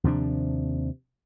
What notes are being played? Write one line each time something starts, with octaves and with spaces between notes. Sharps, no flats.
D#2 C3 F3 D4